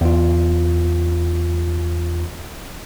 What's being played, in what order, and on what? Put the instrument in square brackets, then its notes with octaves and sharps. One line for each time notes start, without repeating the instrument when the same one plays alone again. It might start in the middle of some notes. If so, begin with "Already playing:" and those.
[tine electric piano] E2 F4